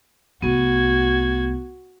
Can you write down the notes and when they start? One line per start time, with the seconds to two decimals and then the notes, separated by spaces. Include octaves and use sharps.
0.42 C2 A3 B3 F#4 G#6